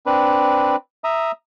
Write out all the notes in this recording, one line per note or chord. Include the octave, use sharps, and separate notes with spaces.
C4 D4 B4
E5 A#5 D#6